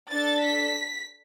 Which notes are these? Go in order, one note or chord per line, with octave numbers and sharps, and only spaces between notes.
D4 A4 A6
B6